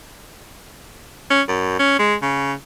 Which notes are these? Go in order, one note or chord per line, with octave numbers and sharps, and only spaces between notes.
C#4
F#2
C#4
G#3
C#3